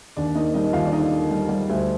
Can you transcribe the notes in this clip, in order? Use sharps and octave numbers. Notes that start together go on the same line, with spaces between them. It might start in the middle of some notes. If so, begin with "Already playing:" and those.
D#2 D4 D5
A#3 D#4 D#5
G3 D#4 D#5
D#2 F4 F5
D5
D3 D#4 D#5
D3
G3
G3
D2